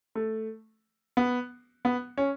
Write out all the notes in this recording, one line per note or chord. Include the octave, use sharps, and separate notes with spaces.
A3
B3
B3
C#4